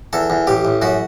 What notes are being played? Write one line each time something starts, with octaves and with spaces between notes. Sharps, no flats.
E2 A4
E2
A1 G4
A1
F#2 F#4